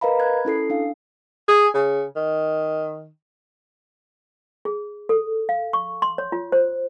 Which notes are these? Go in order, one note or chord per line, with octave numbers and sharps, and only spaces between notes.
A#4 B4 D#5 F5 A#5 B5
B5 F#6 G#6
C#4 E4 A4 C7
D4 F5
G#4
C#3
D#3
G#4
A4
F5
C#6
C6
C#5
F4
C5